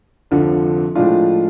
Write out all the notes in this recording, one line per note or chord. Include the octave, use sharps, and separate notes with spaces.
F1 F2 D3 F3
A2 F3 G#3 D4 F4